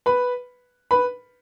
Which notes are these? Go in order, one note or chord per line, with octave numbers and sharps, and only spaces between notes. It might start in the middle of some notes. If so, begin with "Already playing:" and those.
B4 B5
B4 B5